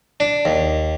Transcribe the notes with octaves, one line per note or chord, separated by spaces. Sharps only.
D4
D#2